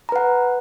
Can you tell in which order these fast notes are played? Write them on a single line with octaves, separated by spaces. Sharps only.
A#5 B4 F#5